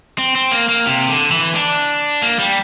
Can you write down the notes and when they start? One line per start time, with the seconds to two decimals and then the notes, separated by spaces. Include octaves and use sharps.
0.18 C4
0.35 C4
0.52 A#3
0.69 A#3
0.87 C3
1.08 D3
1.31 E3
1.55 D4
2.22 A#3
2.39 G3